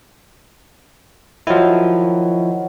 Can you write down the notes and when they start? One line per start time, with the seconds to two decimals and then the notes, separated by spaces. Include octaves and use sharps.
1.47 D#3 F3 F#3 E4